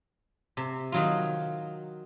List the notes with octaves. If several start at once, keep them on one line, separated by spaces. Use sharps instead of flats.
C3
D#3 F#3 F4